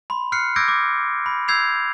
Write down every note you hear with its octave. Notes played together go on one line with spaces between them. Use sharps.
B5 C6
F6 F#6 C7 C#7
D6 E6 G6 G#6 A#6 D7
D6
B5
E6 G6 G#6 C7 F7